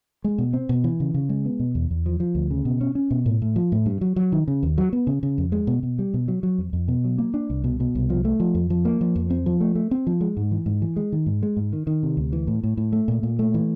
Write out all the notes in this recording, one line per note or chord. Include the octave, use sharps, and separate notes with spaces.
G#3
B2
C4
B2
E3
C#3
C#3
G#3
B3
B2
E2
E2
F3
F3
D2
C#3
B2
C#4
C#4
B2
A2
A2
F3
A2
G2
F#3
F#3
D#3
C#3
D#2
F#3
B3
C#3
C#3
F2
G#3
B2
B2
G3
B2
F#3
F#3
F2
F2
B2
F#3
A#3
D4
C2
B2
B2
C2
F3
A3
F3
F2
F3
A#3
F3
F2
C4
F3
A3
A3
C4
F3
G#3
G#2
E3
G#2
E3
G#3
D#3
G#2
G#3
G#2
D#3
D#3
C3
D2
E3
A2
A2
A2
A3
A#2
A#2
A3
E3